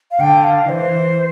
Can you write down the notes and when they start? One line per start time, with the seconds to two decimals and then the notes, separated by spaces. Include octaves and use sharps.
0.11 F5
0.20 D3 G5
0.45 F5
0.68 E3 C5